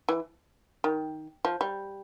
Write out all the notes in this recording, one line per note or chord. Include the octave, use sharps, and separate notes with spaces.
E3
D#3
F3
G3